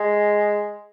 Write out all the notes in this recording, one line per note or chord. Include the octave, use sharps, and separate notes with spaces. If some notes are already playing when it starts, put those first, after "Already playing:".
Already playing: G#3